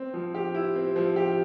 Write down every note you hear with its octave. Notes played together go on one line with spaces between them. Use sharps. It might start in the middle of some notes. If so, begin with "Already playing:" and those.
Already playing: C4
F3
G4
E4
C4
F3
G4